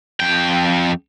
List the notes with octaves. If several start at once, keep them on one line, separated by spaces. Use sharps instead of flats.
F2 G5